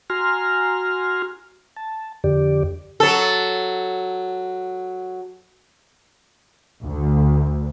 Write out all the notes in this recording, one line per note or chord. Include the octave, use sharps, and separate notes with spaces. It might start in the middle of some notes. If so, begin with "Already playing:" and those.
F#4 G#5 A#5 C6 F6
A5
F2 D3 G4 D5
F#3 A4
D2